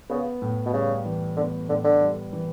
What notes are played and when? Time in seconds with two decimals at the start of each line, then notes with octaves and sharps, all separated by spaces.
0.10 C#3 B3
0.42 A2
0.66 B2
0.73 C#3 G3
1.06 E3
1.37 D3 B3
1.69 A2 D3
1.84 D3
2.01 G3
2.33 E3